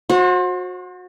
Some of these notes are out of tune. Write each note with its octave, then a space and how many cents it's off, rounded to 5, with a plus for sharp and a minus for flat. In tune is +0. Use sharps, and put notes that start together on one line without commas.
F#4 -30 C5 +30